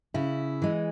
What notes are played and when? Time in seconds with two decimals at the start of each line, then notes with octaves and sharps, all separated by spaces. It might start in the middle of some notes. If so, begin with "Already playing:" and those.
0.14 C#3 E4
0.62 E3 G#3